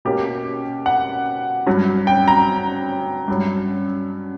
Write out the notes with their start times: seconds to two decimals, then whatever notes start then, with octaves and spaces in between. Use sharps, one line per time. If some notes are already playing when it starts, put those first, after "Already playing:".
0.05 B2 A#3 C#4 G4
0.86 F#5
1.66 G2 F#3 C#4
2.07 G5
2.28 A#5
3.28 G2 F#3 C#4